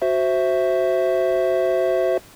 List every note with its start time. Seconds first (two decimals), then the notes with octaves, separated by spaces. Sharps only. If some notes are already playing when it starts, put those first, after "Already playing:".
0.02 F#4 C5 E5